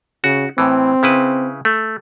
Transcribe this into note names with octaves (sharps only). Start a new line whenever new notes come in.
C#3 F#4
A2 E3 C4
C#3 E4 B4
A3